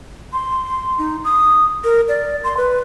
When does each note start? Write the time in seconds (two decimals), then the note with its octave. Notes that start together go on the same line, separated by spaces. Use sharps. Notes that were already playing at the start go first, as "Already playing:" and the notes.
0.33 C6
0.98 D#4
1.24 D#6
1.84 A#4
2.08 D5
2.44 C6
2.57 B4